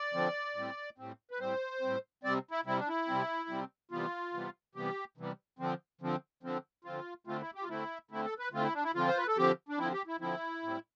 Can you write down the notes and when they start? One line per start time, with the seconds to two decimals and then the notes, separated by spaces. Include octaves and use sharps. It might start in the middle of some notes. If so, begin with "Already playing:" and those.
Already playing: D5
0.14 D3 F3 C4
0.55 A2 G3 C4
0.98 A2 G3 C4
1.31 B4
1.39 A2 G3 C4 C5
1.81 A2 G3 C4
2.23 C3 G3 C4 D5
2.51 E4
2.65 C3 G3 C4 E4
2.77 D4
2.88 E4
3.07 C3 G3 C4
3.49 C3 G3 C4
3.91 C3 E3 G3 B3 F4
4.34 C3 E3 G3 B3
4.75 C3 E3 G3 B3 G4
5.17 C3 E3 G3 B3
5.59 D3 F3 C4
6.01 D3 F3 C4
6.43 D3 F3 C4
6.84 D3 F3 C4 F4
7.27 D3 A3 C4 F4
7.41 E4
7.55 G4
7.62 F4
7.69 D3 A3 C4 E4
8.11 D3 A3 C4 E4
8.24 A4
8.39 B4
8.52 D3 A3 C4 F4
8.63 E4
8.73 D4
8.84 E4
8.95 D3 F3 C4 F4
9.08 C5
9.17 B4
9.28 A4
9.37 D3 F3 C4 G4
9.69 D4
9.78 D3 F3 C4 E4
9.93 G4
10.07 E4
10.20 D3 F3 C4 E4
10.63 A2 G3 C4